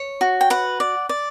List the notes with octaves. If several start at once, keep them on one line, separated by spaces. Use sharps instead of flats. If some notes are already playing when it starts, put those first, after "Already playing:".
Already playing: C#5
F#4
G5
B4 F#5
D5
D5